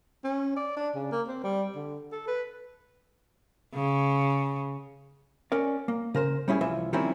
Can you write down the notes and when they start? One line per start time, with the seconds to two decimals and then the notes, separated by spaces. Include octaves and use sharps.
0.24 C#4
0.56 D5
0.77 D4
0.95 C#3
1.11 A#3
1.28 C4
1.44 G3
1.75 D3
2.12 A4
2.27 B4
3.74 C#3
5.52 C#4 A#4 D5
5.88 A#3
6.14 C#3 A#4 C5
6.48 G3 C#4 E4 G#4
6.61 C2 E3 F3 E5
6.93 D#3 F3 G3 C4 C#4 E4